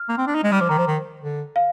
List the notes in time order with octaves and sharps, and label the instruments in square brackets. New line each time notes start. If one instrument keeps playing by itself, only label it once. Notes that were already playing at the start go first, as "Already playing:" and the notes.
Already playing: [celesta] F6
[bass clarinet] A#3
C4
D4
D#4
G#3
[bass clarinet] G3 [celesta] F6
[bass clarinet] F3 [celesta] D6
[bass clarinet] D#3 [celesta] A#5
[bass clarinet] F3
D#3
D3
[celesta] F5